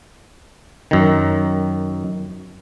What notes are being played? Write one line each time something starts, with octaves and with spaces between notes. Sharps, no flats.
F#2 D#3